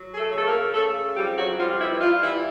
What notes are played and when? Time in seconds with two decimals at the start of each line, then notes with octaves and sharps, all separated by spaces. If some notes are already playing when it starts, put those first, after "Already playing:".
Already playing: F#3
0.13 G#4
0.18 A3 A4
0.32 C#3
0.37 A4
0.46 A#3 A#4
0.74 C#3 A3 A4
1.16 F2 G3 G4
1.37 F#3 F#4
1.59 F3 G3 F4
1.79 E3 E4
2.01 F3 G3 F4
2.22 E3 E4